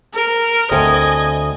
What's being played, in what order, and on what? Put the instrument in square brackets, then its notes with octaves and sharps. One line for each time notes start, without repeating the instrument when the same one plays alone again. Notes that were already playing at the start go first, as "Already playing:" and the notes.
[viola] A#4
[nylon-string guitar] D2 A3 C4 [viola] D#5 G#5